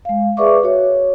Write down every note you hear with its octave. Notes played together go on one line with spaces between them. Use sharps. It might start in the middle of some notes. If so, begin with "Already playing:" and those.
G#3 F5
G#4 B4 D5 E5 C#6 D6
F#4 C#5